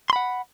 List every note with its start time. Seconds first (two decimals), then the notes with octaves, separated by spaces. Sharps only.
0.10 C6
0.13 B5
0.16 F#5